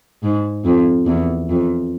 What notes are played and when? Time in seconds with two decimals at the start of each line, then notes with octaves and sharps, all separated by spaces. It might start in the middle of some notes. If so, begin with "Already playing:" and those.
0.23 G#2
0.65 F2
1.06 E2
1.49 F2